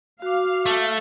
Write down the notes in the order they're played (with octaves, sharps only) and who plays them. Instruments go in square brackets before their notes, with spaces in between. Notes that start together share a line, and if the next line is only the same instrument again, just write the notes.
[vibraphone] F#4 D6 [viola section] F5
[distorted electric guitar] A3